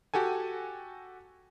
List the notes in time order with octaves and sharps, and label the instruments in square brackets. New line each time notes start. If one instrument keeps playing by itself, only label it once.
[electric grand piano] F#4 G4 A4 G#5